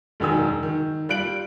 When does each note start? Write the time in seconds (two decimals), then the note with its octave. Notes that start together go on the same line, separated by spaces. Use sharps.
0.20 E1 F#2 D#3 G#5 E6
0.63 D#3
1.09 G3 F4 F#6 D7 F#7